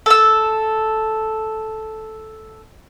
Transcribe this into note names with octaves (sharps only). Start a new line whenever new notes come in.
A4 E6